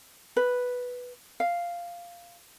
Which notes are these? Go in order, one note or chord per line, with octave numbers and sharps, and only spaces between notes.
B4
F5